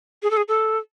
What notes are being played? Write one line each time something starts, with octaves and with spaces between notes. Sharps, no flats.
G#4
A4
G#4
A4